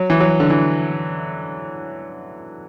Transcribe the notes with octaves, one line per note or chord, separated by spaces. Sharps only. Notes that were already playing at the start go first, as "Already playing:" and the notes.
Already playing: F#3
E3
F#3
D3
E3